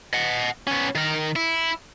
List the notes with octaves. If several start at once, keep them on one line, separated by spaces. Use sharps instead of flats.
D#5 F#5
B3 C#4
D#3 A#4
E4